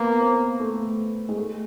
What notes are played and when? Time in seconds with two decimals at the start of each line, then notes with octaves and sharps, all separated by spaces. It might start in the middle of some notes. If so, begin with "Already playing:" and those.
Already playing: A#3 B3
0.20 C4
0.60 A3
1.29 G#3
1.37 A3